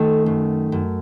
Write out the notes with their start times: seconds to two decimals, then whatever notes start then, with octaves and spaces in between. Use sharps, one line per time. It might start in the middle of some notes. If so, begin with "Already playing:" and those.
Already playing: D#3 A3
0.26 F#2
0.72 F#2